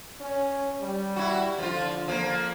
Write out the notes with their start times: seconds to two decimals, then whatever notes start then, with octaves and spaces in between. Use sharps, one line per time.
0.20 C#4
0.81 G3
1.16 E4 F#4
1.58 D3 F3 F4
2.08 F3 A#3